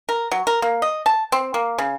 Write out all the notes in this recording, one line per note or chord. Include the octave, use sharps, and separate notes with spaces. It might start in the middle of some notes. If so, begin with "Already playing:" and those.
A#4
F#3
A#4
A#3
D#5
A5
C4
A#3
C#3